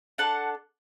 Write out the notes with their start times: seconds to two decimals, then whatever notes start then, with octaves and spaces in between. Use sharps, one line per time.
0.18 D4 A4 F#5 A5